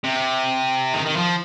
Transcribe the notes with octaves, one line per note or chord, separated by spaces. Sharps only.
C3
D#3
D#3
F3